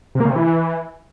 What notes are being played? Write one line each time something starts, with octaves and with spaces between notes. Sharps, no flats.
C3
A#3
C#3
C3
E3